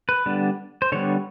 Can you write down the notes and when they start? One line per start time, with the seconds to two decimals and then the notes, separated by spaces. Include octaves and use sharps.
0.09 B4
0.26 D3 G3 B3 D4
0.82 C5
0.92 D3 G3 B3 D4 C#5